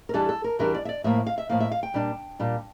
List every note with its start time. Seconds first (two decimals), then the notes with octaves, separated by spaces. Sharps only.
0.09 A#4
0.14 E2 E3 G3 D4 A4
0.29 A4
0.44 A#4
0.59 E2 E3 G3 D4 A#4
0.74 D5
0.85 E5
0.89 D5
1.04 A2 F3 A#3 E5
1.27 F5
1.38 E5
1.49 A2 F3 A#3 F5
1.60 E5
1.72 F5
1.83 G5
1.94 A#2 G3 D4
2.39 A#2 G3 D4